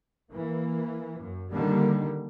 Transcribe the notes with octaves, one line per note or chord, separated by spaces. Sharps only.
E3 A#3
F#2
D3 D#3 G3 A#3